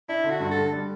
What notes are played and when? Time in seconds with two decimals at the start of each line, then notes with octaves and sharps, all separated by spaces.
0.09 D4 E4
0.24 D3
0.30 F#4
0.40 G2
0.51 A4
0.57 D3
0.73 G3